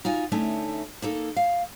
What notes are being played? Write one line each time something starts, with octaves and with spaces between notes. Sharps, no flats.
D#4 F4 F#4 G#5
D3 A3 C#4 D#4 E4
A#3 D#4 A4
F5